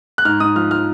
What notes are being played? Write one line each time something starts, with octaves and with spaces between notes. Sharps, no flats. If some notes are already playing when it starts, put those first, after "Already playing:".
F#6
G#2 F6
G#2 D#6
F3 F6
F3 F6